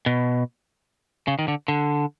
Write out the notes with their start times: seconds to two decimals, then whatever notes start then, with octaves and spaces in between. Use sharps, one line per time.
0.06 B2
1.28 C#3
1.39 D#3
1.48 D3
1.68 D3